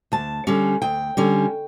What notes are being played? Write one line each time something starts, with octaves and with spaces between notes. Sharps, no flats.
D2 A5
D3 G3 C#4
D2 G5
D3 G3 C#4